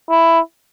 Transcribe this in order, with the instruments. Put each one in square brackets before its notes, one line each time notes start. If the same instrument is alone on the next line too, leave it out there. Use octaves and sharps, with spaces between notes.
[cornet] E4